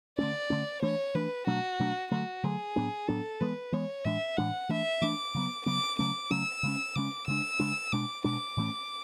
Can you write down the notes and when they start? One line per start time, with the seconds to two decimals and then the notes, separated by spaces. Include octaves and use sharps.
0.18 D3 A3 C#4 D5
0.50 D3 A3 C#4
0.82 E3 A3 D4 C#5
1.15 E3 A3 D4 B4
1.47 B2 F#3 A3 D4 F#4
1.80 B2 F#3 A3 D4
2.12 D3 F#3 A3 F#4
2.44 D3 F#3 A3 G#4
2.76 A2 F#3 B3 D4
3.08 A2 F#3 B3 D4 A4
3.41 E3 G#3 B3 B4
3.72 E3 G#3 B3 C#5
4.05 A2 E3 G#3 D4 E5
4.37 A2 E3 G#3 D4 F#5
4.69 E3 A3 D4 E5
5.02 E3 A3 D4 D6
5.35 C#3 F#3 B3
5.66 C#3 F#3 B3 D6
5.99 C#3 F#3 A3 C#4 D6
6.31 C#3 F#3 A3 C#4 E6
6.63 C#3 G#3 C#4
6.96 C#3 G#3 C#4 D6
7.28 C#3 G#3 D4 E6
7.59 C#3 G#3 D4
7.92 B2 G#3 D4 D6
8.24 B2 G#3 D4 D6
8.57 A2 E3 A3 C#4